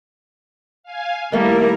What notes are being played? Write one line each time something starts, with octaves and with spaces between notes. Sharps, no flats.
F5 G#5
D#3 G3 A3 A#3 D#4 E4 A#4